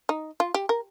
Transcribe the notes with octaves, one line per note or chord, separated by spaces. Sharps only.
D#4
F4
G4
A#4